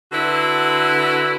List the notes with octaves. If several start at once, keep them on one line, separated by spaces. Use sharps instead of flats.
D3 E4 F#4 B4